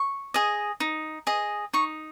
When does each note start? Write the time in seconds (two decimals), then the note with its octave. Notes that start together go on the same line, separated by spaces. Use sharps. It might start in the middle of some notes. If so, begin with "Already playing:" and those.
Already playing: C#6
0.34 G#4 D#5
0.80 D#4
1.27 G#4 D#5
1.73 D#4 C#6